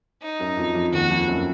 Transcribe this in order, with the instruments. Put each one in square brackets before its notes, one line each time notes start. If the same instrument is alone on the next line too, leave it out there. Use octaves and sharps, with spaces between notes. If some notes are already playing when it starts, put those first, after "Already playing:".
[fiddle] D#4
[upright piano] F#2 F#3
F2 F3
F2 F3
[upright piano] D#2 D#3 [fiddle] F#4
[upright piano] F2 F3
F#2 F#3